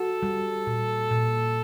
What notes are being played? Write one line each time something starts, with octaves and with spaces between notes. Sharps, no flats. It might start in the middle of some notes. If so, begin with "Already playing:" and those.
Already playing: F#4 A4
G3
A#2
A#2